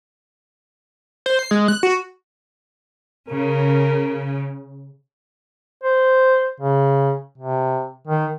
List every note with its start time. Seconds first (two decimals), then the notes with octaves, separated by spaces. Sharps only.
1.26 C5
1.39 C7
1.51 G#3
1.68 F#6
1.83 F#4
3.29 C#3 A#4
5.84 C5
6.61 C#3
7.38 C3
8.08 D#3